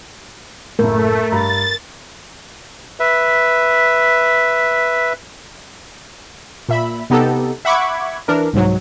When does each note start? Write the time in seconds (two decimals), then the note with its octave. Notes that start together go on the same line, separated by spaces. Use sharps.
0.79 F#1 A2 A3 A#4
1.32 G2 A#5 B5 A6
3.00 B4 E5
6.69 A#2 E5 B5
7.10 C3 B3 D#4 G4 A4
7.65 E5 F#5 B5 C#6 D6 G#6
8.28 E3 D4 A#4
8.53 C2 G#2 F#3